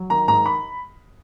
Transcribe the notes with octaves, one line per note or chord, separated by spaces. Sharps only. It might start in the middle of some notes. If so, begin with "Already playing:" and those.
Already playing: F#3
D#3 A#5
G#2 A#5
B5